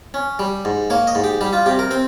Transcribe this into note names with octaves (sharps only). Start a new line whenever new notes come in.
C#4
G3
G#2
A#3 C#5
D#5
G#2
G4
G3 G4
F4
C3 G4
A#4
C4 C5